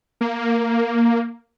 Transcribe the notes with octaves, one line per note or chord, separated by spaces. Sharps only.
A#3